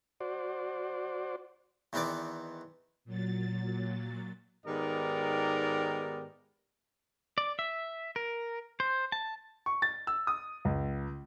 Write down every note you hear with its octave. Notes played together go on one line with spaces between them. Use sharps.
F#4 C5 D5
E2 D#3 B3 C4 D5 D6
A#2 F#3 A6
G#2 D#3 B3 G4 A#4 D5
D5
E5
A#4
C5
A5
C#6
A6
E6
D#6
C#2